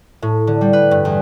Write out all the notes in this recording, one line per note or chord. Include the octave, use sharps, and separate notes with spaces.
A2
D3
G3
B4
G2
E2